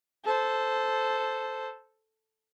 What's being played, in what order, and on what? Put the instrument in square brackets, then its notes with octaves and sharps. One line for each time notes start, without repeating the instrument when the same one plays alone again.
[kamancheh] A4 C5